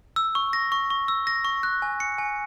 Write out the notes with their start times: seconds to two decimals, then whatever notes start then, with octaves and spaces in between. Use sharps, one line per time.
0.16 E6
0.35 C#6
0.53 A#6
0.72 C#6
0.90 C#6
1.08 E6
1.27 A#6
1.45 C#6
1.63 F#6
1.82 G#5
2.00 C#7
2.18 G#5